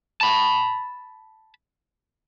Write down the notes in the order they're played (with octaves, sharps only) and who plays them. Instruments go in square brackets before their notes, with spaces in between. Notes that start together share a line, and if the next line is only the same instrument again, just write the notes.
[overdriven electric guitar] A5 B5